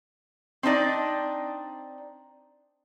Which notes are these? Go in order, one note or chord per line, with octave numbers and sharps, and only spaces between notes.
C4 D4 D#4 D5